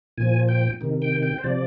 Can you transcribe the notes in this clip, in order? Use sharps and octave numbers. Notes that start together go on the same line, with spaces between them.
A#2 F3 G#5
G5
C3 D#3
G5
G5
C5
C3 F3 D5